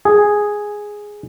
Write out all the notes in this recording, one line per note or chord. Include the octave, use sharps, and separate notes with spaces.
G#4